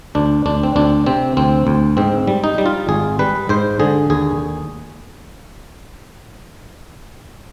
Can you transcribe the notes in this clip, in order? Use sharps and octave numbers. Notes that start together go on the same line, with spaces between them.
D2 D4
D2 D4
C4
D2 D4
C3 C4
D2 C4
D2
G#2 C4
G3
D#4
G3
F4
G#1 G#4
G3 B4
G#2 C5
D3 G#4
D#2 G#4